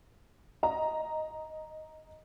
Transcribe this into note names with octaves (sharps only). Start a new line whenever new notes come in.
D#5 A#5